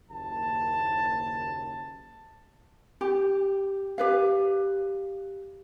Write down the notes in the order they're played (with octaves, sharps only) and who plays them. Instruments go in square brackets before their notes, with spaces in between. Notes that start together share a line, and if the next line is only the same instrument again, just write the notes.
[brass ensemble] F#1 D#2 A5
[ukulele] G4
G4 B4 F5